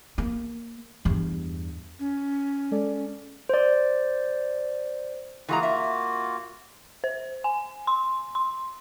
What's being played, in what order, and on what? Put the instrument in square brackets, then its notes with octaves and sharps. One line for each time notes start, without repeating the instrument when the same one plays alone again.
[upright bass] A#3
E2 G2
[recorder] C#4
[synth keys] G#3 A4 D5
[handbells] C5 D5
[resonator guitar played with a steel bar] E3 G#3 A#5 [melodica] A#3 F4 F#4
[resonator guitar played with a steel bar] E5
[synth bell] C5
G#5
C6
C6